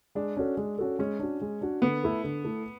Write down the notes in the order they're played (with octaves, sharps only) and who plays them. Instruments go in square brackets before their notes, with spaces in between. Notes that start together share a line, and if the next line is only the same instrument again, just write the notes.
[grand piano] G#3 [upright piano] D4
[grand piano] C#4 F#4 A4
G#3
C#4 F#4 A4
[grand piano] G#3 [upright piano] C#4
[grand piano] D4 F#4
G#3
D4 F#4
[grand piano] D3 [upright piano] B3
[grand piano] A3 E4 A4
D3
A3 E4 A4